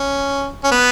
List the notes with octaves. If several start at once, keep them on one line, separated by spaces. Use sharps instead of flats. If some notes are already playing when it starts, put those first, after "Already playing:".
Already playing: C#4
C#4
B3